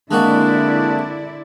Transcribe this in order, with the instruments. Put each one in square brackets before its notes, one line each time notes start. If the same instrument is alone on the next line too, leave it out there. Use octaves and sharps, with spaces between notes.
[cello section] D3 E4 D5 [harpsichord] G#3 A#3 F#4 [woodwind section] C4 D4